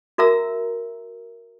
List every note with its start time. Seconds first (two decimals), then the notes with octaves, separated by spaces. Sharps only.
0.18 F#4 A#4 E5 A#5 E6